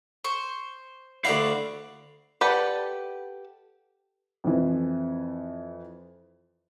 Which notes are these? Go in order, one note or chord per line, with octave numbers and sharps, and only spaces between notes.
C5 C#6
D2 E4 F#4 D5 F5
G4 A4 B4 D5 F#5
F2 E3